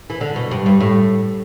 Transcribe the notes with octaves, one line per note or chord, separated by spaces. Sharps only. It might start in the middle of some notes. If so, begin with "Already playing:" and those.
E3
D3
B2
G2
G2
A2